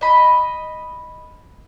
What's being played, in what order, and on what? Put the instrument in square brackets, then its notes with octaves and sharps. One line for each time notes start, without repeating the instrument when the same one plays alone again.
[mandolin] D#5 B5